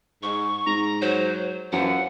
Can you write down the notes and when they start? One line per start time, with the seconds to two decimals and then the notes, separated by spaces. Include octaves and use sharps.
0.23 G#2 C#6
0.67 G#2 A#5
1.02 F#3 C5
1.72 F#2 E3 F3 F#5